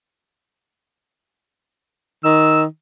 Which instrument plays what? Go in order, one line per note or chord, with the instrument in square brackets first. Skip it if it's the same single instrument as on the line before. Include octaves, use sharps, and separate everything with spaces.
[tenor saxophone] D#3 [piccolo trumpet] E6